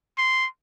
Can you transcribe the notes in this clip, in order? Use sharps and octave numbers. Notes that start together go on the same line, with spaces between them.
C6